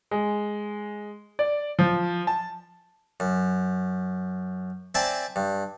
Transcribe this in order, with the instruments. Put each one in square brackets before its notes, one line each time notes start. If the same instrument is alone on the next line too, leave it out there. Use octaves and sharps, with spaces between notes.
[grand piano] G#3
D5
F3
A5
[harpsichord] F#2
C4 D5 E5 G#5 A5
G2